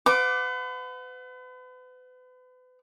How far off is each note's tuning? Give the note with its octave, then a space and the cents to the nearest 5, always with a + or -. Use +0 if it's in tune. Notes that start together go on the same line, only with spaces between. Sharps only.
B4 +40 F#5 -30 D6 +0